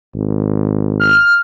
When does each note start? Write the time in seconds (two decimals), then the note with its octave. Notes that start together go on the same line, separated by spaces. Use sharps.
0.15 G#1
1.00 F6